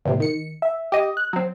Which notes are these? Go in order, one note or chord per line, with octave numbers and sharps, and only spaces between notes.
E2 A2 C3
D#3 C#7
E5
G4 D#5
F#6
F#3 C4